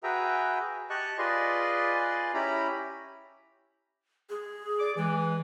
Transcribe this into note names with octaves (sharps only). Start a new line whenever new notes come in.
F#4 G#4 B4 E5 G5 A#5
G4 D#5 A5 C#6 F#6
F4 G#4 B4 D5 D#5 C6
C#4 E4 G4 A#5 B5
G#4
D5 D6
E3 G#3